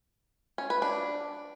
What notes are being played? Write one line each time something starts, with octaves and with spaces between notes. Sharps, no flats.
C#4
B4
D4